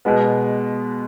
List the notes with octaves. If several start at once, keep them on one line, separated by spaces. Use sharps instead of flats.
B2 G#3 B3